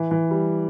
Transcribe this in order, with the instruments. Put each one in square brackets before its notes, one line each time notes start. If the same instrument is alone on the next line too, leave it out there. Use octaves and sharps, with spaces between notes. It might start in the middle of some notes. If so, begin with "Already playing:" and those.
Already playing: [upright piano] E3
E3
G3